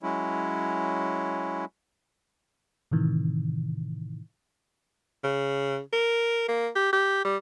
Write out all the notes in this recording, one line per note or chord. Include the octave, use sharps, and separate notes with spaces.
F#3 G#3 C#4 E4
A2 C3 D#3 E3
C#3
A#4
A#3
G4
G4
G3